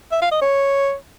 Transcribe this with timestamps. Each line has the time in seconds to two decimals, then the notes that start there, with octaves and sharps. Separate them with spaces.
0.12 E5
0.22 F5
0.32 D#5
0.42 C#5